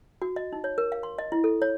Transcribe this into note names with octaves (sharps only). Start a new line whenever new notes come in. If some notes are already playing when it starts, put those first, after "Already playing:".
F#4
D#5
D#4
C#5
A#4
F5
C6
D#5
E4
A4
C#5